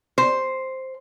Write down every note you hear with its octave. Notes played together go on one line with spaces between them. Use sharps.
C5